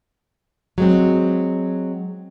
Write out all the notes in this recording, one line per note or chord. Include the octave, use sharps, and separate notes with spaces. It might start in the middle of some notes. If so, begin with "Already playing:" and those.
F#3 G#3 C4